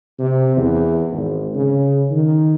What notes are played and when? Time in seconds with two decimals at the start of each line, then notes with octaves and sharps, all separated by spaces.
0.19 C3
0.57 E2
1.11 G#1
1.55 C#3
2.11 D#3